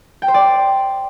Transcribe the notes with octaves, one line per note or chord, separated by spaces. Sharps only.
G5
C5
D5